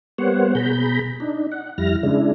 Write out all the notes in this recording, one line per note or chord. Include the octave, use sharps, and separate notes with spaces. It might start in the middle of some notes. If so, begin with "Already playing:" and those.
G3 A#3 B3 C5 C#5 F#5
B2 G#4 A#5 B5 G6
D4 D#4
F#5
F2 G3 E4 F6 A#6
C#3 G#3 D4 E4